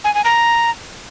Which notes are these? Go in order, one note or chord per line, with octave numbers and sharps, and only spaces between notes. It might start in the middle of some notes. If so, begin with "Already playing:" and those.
G#5
G#5
A#5